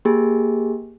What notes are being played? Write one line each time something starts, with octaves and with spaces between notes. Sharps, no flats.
A#3 G4 G#4